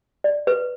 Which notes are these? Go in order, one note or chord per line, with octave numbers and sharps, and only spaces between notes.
D5
B4